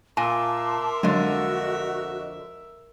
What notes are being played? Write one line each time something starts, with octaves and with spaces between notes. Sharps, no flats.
A#2 A#4 E5 G#5 A5 C6 D6
F2 D3 F#3 G#3 F#4 D#5